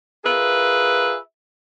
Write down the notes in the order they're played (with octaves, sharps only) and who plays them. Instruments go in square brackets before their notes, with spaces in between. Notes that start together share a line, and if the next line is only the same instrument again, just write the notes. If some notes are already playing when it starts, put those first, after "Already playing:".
[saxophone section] F4 G#4 A#4 B4 E5